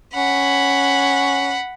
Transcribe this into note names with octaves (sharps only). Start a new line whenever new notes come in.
C#4 F#5 B5